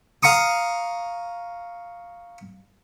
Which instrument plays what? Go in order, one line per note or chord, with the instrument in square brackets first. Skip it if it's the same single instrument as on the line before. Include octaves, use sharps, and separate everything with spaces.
[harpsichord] F5 A#5 C#6 D#6